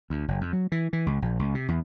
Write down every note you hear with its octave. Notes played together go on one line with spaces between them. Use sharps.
D2
F#1
F2
F#3
E3
E3
C#2
A#1
C#2
C3
E2